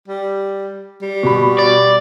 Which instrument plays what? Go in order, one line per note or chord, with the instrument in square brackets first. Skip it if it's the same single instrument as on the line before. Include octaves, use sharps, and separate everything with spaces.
[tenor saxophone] G3
G3
[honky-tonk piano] B2 B5
[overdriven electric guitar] D5